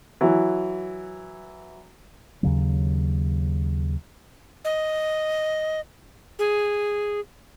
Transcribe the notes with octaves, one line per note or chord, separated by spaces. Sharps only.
E3 F#3
D#2 C#3 F#3
D#5
G#4